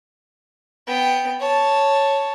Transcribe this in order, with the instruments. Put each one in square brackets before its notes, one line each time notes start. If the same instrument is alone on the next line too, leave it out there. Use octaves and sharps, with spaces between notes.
[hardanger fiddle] B3 G5
C#5 A5